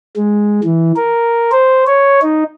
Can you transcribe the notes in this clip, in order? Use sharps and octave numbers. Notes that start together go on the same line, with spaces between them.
G#3
E3
A#4
C5
C#5
D#4